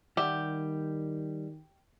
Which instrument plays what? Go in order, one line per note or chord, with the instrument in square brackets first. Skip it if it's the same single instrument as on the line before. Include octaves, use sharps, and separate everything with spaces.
[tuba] D#3 [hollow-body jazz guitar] G3 E5 F#5 [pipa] G4